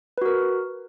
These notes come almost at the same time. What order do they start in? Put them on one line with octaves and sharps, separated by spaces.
B4 F#4 A#4